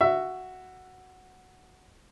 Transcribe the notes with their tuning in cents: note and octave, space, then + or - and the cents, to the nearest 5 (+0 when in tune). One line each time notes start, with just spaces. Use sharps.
F#4 +0 E5 +15